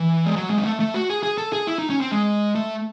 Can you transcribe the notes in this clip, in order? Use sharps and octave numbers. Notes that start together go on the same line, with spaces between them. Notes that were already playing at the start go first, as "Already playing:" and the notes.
Already playing: E3
G#3
F#3
G#3
C4
A3
A3
F#4
G#4
G#4
A4
G#4
E4
D#4
C#4
C4
G#3
A3